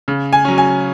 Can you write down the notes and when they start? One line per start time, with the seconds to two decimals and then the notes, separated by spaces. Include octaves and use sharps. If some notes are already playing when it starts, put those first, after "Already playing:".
0.08 C#3
0.33 G#5
0.45 F#3 C#4
0.58 G#5